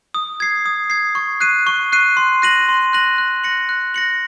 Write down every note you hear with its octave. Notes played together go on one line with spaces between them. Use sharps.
D#6
G#6 C7
D#6
G#6 C7
C#6
F#6 C7 D#7
C#6
F#6 C7 D#7
C6
F#6 A#6 D#7 F#7
C6
F#6 A#6 D#7 F#7
F#6
A#6 C#7 F#7
F#6
A#6 C#7 F#7